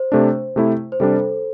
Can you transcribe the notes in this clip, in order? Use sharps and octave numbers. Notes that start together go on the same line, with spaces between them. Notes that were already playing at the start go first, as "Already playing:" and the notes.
Already playing: C5
C3 A3 D4
C3 A3 E4
C5
C3 G3 D4 A4